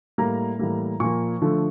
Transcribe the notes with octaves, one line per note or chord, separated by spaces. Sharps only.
A2 G3 A#3 A#5
A2 E3 G3 A#3
A#2 F3 A#3 C#6
D3 F3 A3